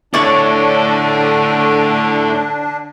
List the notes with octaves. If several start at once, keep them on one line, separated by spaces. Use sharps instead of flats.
D3 A3 D4 E4 C#5 D5